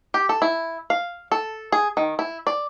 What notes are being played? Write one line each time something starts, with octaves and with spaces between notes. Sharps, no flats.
G4
A4
E4
F5
A4
G#4
D#3
E4
D5